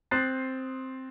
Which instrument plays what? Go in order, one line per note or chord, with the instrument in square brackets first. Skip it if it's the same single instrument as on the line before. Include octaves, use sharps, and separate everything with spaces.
[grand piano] C4 C6 D#6 F#6 A6 C7